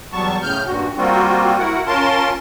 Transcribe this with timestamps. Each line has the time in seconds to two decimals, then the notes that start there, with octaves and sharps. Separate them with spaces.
0.12 E2 F#3 G3 B3 A5 C#6
0.42 A2 C#3 F6 G6
0.67 G2 A#2 F#4
0.97 G3 A#3 C4 F4 F#4
1.59 E4 F#4 A#4 F#5
1.87 C#4 F4 A#4 A5 C6